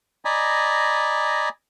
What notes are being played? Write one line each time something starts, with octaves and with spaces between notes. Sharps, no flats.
D5 D#5 G#5 A#5 B5